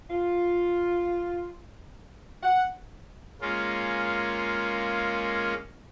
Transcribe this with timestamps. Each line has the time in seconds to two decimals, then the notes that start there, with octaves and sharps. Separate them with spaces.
0.10 F4
2.43 F#5
3.41 G#3 A#3 C#4 F4